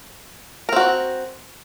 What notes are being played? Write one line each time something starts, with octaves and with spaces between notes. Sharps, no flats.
C4 F#4 A#4